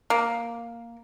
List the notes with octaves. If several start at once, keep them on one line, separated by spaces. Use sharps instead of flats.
A#3